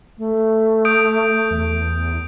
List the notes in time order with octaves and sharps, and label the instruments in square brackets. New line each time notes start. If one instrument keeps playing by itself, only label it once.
[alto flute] A3
[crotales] D#6 G6 D7
[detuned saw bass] E2